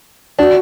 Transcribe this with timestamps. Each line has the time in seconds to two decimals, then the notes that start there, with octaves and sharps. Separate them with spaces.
0.39 D4 F#4